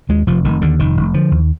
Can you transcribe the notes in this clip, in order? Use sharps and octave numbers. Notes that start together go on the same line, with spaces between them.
D#2 G#3
F1 F3
F1 D#3
D#2 D3
F1 D#3
F1
D3 F3
D#2